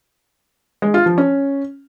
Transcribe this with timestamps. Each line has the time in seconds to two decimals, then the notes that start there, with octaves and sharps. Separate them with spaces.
0.82 G#3
0.94 F4
1.06 F3
1.18 C#4